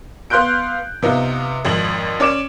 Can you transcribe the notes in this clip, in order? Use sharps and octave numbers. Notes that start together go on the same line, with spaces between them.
B3 F5 C6 F#6 G6 D7
C3 B3 D#4 F4
G#1 F2 F#7
C#4 D5 D6 D7 E7